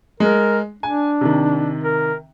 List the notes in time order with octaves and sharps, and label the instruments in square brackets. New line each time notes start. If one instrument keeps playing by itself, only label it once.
[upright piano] G#3 [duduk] A#4
[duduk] D4 [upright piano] G#5
[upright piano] C3 D#3
[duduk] A#4